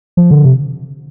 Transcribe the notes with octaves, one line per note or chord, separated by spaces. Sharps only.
F3
D3
C3